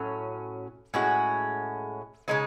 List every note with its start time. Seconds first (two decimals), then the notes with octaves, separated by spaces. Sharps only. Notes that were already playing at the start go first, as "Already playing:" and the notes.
Already playing: A2 F#3 C#4
0.94 A2 G#3 C#4 F#4
2.28 C#3 E3 G#3 D#4